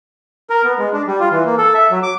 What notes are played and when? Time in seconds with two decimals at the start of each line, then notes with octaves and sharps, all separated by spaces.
0.50 A#4
0.64 B3
0.79 G#3
0.93 D4
1.07 G3
1.20 F4
1.32 E3
1.46 A#3
1.58 A4
1.74 E5
1.91 F#3
2.03 D6